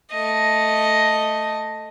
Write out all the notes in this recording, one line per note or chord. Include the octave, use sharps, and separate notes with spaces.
A3 D#5